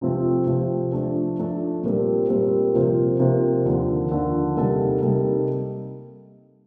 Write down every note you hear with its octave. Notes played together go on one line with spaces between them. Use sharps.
C3 F3 A3 C4 F4
C3 F3 A3 C4 F4
F3 A3 D4 A4
F3 A3 D4 A4
A#2 G3 C4 G4 A#4
A#2 G3 C4 G4 A#4
C3 F3 A#3 F4 C5
C3 F3 A#3 F4 C5
D#2 D3 F3
D#2 D3 F3
C3 G3 A#3 D#4 A4
C3 G3 A#3 D#4 A4